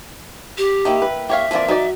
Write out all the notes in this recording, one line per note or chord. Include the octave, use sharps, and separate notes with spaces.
G4
D#3 A#3 E4 G5
B4
G4 C#5 E5 F5
E3 F3 A#3 C4 D5
F#3 D#4 D5